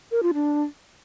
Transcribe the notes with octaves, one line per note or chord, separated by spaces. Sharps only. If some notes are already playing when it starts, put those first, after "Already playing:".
A#4
F4
D4